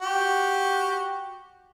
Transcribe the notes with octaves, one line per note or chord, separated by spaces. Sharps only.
F#4 G4